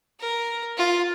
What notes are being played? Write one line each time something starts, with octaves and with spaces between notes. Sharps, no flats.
A#4
F4